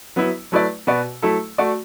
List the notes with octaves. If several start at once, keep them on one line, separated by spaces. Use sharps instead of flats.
F#3 B3 E4
F#3 A3 E4 B4 D5
B2 B3 F#4 B4 D5
F#3 A3 E4 A4
A3 F#4 D5